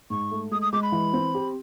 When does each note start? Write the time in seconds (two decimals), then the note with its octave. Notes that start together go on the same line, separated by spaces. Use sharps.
0.10 G#2 C#6
0.31 A3
0.51 G#3 D#6
0.62 D#6
0.73 G#3 D6
0.83 B5
0.92 E3
1.14 C4
1.34 G4